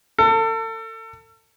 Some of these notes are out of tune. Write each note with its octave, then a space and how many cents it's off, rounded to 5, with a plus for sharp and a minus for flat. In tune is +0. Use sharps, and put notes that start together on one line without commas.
A4 +35